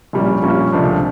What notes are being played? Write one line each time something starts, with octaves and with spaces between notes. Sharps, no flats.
A#1 A#2 G3 A#3 C#4
A#1 A#2 G3 A#3 C#4
C#2 C3 F3 A3 D4